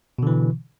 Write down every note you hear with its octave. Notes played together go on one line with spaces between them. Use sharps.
B2 D3 E3